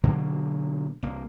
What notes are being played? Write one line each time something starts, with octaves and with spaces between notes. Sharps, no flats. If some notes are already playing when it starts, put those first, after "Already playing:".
B2 D3 F#3 A#3
C2 A#3